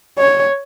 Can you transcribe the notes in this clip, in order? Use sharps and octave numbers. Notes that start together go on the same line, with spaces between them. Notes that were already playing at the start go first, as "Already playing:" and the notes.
C#5